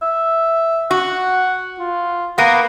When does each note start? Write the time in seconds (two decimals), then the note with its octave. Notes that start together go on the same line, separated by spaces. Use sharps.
0.02 E5
0.91 F#4 F#5
1.79 F4
2.38 A#3 B3 F#5